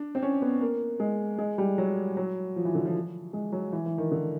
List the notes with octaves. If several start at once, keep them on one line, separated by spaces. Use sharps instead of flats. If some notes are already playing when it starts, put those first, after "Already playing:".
Already playing: D4
C4
C#4
B3
A#3
G#3
G#3
G3
F#3
F#3
F3
E3
D3
F3
G#3
F#3
E3
E3
D#3
D3